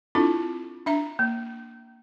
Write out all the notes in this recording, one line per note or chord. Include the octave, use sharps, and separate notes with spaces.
C4 D4 E4 F4 A4
D4 E5 A#5
A#3